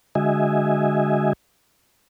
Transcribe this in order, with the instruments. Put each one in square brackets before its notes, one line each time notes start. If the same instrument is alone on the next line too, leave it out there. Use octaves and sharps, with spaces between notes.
[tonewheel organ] D3 G#3 F#4 D#5 E5 G#5